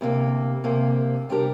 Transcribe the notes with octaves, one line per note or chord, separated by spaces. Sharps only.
D2 C3 A#3
D2 C3 A#3
C3 G3 D4 G4 A#4